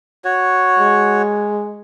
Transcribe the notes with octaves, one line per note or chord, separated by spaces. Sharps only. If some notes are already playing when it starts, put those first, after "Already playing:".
F#4 C#5
G#3